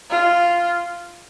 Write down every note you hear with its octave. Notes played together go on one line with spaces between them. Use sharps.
F4